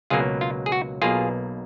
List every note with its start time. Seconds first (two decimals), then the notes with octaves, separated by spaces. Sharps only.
0.10 C#2 B2 F#3 A#3 F4 G#4
0.41 F4
0.66 G#4
0.72 F#4
1.02 B1 B2 A#3 F4 G#4